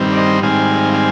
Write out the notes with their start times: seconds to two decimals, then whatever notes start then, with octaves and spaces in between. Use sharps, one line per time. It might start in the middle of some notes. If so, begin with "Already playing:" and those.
Already playing: G2 D#3 G3 C4
0.12 D5
0.17 C5 D#5
0.43 G#2 D#3 G3 C4 F5 G#5
0.94 F5 G#5